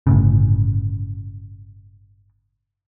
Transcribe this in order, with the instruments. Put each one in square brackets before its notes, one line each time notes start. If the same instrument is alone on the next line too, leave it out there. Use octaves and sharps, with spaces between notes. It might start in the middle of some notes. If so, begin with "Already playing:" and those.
[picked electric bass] G1 A2 C#3